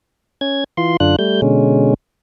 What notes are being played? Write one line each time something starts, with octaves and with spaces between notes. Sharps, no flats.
C#4 G#6
E3 F4 C6
F#2 D3 D4 F4 F#6
G3 A3 G6
B2 D3 G#3 C#4